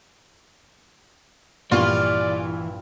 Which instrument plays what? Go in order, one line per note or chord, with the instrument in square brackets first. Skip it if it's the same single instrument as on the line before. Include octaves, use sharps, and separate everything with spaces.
[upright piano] A#1 G2 C#6 [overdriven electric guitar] E3 [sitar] F4 [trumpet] D5